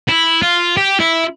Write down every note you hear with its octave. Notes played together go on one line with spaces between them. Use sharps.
E4
F4
G4
E4